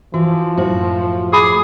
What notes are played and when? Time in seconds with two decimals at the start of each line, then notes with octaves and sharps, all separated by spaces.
0.14 E3 F3 F#4
0.57 F#2 A2 E4 F#4 C5
1.33 G#4 B5 D6